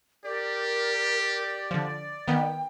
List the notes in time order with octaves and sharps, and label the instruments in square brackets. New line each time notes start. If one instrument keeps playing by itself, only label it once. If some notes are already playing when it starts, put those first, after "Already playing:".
[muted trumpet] G4 [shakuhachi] A#4 [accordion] D5
[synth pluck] D3 F3
[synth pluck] D#3 B3 [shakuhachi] G5